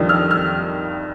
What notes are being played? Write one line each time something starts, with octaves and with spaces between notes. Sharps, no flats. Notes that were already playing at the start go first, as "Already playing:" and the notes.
Already playing: F2 D#3 G3 D4
F6
F6